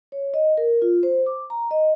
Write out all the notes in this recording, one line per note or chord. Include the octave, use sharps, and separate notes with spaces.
C#5
D#5
A#4
F4
C5
D6
A#5
D#5